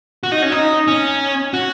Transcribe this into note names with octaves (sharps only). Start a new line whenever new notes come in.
F#4
D#4
C#4
D#4
C#4
F#4